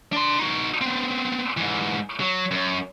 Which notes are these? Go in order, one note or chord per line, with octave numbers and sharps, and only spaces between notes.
D4 C6
D#4 F#4
B3 C4
G#2 E3
F#3
F#2